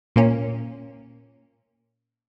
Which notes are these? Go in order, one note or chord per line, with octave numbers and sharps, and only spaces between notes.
A#2 A#3 C#4